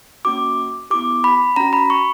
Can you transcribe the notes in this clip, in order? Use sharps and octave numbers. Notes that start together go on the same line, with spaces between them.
A#3 C#4 F#4 D6
B3 E4 G4 D6
B5
C#4 F#4 A#5
B5
C#6